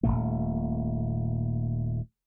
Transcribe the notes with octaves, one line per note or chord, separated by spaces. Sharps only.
D#1 E2 A#2 A3